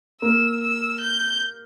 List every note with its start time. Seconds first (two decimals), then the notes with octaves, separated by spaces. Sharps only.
0.21 A#3 E6
0.61 E6
1.01 G6